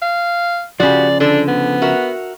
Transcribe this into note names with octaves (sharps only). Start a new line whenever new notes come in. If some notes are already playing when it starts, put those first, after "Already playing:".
F5
C#3 F3 F#4 G4 D5
D3 D4 A4
B3
F#4 A#4 E5